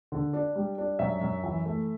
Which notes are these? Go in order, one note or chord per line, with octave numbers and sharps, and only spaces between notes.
D3
D4
G3
D4
F#2 E5
F#2
E3
A3